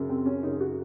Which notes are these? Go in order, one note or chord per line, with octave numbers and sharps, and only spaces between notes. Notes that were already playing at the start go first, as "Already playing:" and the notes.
Already playing: F#2 C#3
C4
C#4
F#2 C#3 D#4
F#4